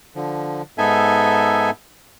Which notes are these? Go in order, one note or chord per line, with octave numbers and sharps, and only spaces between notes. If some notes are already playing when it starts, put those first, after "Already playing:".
D3 F3
G#2 B3 D#4 A4 E5 G#5